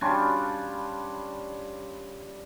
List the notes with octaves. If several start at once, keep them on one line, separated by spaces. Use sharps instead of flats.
G3 C#4 D4 F4